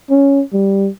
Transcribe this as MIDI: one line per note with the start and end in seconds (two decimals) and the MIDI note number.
0.10 0.41 61
0.53 0.89 55